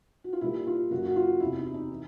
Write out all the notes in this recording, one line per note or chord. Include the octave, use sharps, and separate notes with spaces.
F#4
F4
A#2 G3 A#3 E4
F4
F#2 C#3 F#3 A#3 F#4
F#4
F4
E2 C3 E3 E4
D#4
E4
D#4
E3